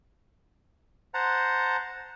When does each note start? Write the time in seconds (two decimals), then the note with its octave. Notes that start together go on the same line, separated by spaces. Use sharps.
1.14 C5 F#5 A5 A#5